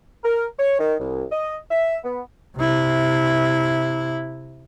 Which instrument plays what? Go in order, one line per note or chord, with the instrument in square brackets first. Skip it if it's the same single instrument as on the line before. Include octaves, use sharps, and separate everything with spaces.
[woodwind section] A#4
C#5
D#3
C2
D#5
E5
B3
[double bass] C3 E4